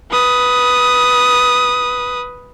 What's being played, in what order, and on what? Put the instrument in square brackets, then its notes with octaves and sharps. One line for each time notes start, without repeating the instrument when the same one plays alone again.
[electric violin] B4 D#6